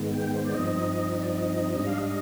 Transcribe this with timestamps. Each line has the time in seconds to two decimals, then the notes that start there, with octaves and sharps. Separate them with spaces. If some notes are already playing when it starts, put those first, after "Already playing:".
Already playing: G#2 D#3 G#3 B3
0.14 G5
0.34 C5
0.45 D5
0.54 G2 F3 C4 D#4 D#5
1.15 D#5
1.23 D5
1.31 D#5
1.75 G#2 G3 D4 D#5
1.87 F5
1.98 D#5